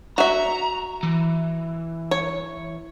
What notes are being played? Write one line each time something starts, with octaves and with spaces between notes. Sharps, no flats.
F#4 E5 A#5
E3
C#5